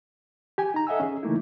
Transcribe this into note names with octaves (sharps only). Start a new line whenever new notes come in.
G4 G#5
D#4 A#5
A4 D#5 E5 F#5 G#5 E6
C#4 G#4
C#3 E3 A3 A#3 D#4 E4